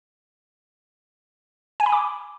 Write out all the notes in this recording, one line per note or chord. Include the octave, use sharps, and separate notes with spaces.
G#5
B5
D6